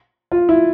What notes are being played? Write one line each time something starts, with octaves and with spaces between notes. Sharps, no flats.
F4
E4